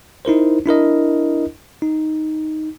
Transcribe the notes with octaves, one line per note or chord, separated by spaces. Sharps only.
D#4 E4 A#4 C5
D4 E4 A#4 D#5
D#4